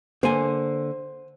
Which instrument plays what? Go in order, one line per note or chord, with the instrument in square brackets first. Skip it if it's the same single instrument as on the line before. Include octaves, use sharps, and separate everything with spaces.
[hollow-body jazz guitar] D3 A#3 G#5 [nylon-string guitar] C5